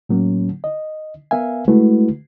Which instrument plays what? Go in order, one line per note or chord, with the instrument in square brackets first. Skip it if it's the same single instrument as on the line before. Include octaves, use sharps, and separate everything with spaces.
[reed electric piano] A2 F#3 A#3 C#4
D#5
B3 A#4 E5 F5 G#5
G#3 A3 E4 F#4 B4